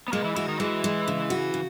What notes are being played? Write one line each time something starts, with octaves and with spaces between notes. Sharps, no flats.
B3
A#2 G#3 A#3
E3 E4
E3 E4 F#4
D#3 D#4
E3 G#3 E4
G#3
C#3
F#4
C#3